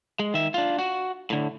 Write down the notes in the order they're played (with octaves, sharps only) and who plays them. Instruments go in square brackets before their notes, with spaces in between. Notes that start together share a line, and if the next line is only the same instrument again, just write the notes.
[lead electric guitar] G#3
D#3 E5
D4 F4
F#4
A2 D3